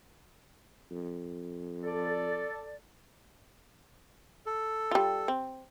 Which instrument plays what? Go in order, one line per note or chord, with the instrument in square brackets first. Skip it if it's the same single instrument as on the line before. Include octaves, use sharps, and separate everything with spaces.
[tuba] F2
[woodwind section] A4 D5
[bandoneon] A4
[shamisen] G3 F4
C4